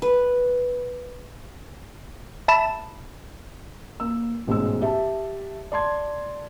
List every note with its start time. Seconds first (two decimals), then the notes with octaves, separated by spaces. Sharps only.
0.02 B4
2.48 E5 A5 B5 E7
4.00 A#3 E6
4.47 A1 G#2 B2 G#3 E6
4.81 G4 E5 A5
5.72 D5 A5 C6 G#6